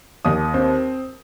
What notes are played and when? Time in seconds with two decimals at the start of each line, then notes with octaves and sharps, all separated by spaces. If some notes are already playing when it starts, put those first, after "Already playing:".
0.25 D#2 D#6
0.54 C4